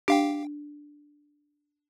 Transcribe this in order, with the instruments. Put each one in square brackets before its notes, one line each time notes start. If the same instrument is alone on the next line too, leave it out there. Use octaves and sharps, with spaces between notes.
[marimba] D4 [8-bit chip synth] G4 F5 G5